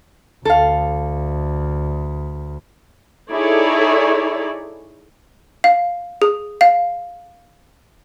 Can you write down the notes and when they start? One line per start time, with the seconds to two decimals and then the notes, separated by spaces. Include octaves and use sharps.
0.45 D2 A4 F5
3.31 D#4 E4 G#4 A4 C#5 D5
5.64 F5
6.22 G#4
6.61 F5